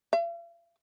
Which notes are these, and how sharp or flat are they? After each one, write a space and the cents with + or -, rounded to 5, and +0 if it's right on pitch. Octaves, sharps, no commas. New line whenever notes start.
F5 -45